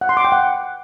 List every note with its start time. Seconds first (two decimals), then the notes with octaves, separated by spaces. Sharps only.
0.01 F#5
0.09 C6
0.17 D6
0.24 G5
0.32 F#5